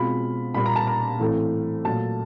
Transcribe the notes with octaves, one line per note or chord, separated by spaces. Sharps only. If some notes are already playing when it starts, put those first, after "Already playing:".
Already playing: B2 G#3 C4 F4 B5
A#2 G3 A#3 B5
A#5
A5
A#5
A2 E3 A3 C4 E4
A#2 F#3 A3 A5